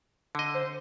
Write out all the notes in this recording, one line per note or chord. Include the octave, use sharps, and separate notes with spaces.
D3 D#5
C5